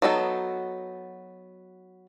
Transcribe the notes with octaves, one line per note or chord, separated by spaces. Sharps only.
F#3 B3 D#4 A4